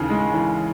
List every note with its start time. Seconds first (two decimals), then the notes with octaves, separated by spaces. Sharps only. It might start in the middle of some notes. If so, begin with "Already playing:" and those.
Already playing: D#2 C#3 E3
0.10 G#3
0.34 E3